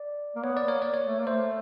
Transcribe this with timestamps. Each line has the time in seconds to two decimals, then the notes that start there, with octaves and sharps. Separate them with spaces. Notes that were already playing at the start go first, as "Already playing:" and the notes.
Already playing: D5
0.35 A#3
0.44 B3 C#5
0.57 D5
0.65 A#3 C#5
0.82 D5
0.94 C#5
1.05 A3
1.20 A#3
1.27 A3 C5